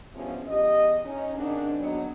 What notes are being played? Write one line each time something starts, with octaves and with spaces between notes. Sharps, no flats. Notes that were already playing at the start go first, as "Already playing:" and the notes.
E2 G2 B2 F3 C#4
E2 G4 D#5
C#4 D#4
G#2 D#3 C4 D4
F#3 B3 D4 D#4